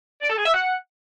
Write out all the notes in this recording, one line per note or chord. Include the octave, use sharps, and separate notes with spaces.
D5
A4
G#4
E5
F#5